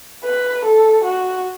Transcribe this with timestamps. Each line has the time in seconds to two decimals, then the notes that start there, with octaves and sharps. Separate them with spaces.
0.24 B4
0.65 A4
1.04 F#4